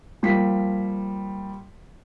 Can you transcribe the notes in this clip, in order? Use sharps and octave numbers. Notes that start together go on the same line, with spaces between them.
F3 G3 A#3 B6